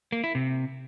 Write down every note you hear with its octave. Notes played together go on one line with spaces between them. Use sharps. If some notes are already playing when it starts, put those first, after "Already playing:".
A#3
E4
C3